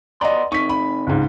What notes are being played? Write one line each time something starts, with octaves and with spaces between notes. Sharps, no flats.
B3 D5 D#5 A#5 C6
C3 D#4 C#6 B6
B5
C#2 G#2